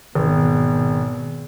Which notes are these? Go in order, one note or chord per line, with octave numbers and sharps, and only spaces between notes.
G#1 B2